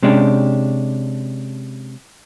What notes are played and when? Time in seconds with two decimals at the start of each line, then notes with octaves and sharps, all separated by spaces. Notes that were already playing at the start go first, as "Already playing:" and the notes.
0.03 C3 G#3 C#4 D4 G4